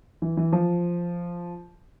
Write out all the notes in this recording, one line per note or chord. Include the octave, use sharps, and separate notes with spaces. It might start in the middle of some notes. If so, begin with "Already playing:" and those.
E3
E3
F3